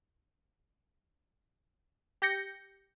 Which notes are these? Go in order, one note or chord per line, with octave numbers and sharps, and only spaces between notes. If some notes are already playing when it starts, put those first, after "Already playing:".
G4 G6 A#6 C#7